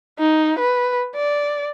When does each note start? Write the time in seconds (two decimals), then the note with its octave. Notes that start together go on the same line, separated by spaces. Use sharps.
0.19 D#4
0.59 B4
1.15 D5